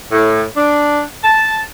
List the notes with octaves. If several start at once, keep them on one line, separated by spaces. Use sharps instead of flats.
A2
D4
A5